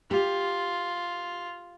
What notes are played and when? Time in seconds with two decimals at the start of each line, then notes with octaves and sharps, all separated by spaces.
0.11 F4 G4